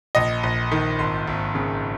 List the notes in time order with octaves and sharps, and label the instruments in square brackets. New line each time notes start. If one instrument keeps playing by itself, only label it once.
[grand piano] A#1 D#5
A#1
D#3
G#1 C6
G#1
C#3